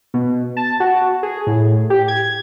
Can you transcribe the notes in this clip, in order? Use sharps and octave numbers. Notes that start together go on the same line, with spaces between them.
B2
A5
F#4
G#4
A2
G4
G#6